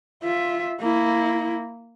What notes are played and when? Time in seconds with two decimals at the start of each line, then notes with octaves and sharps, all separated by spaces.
0.23 F4 E5
0.81 A#3 E4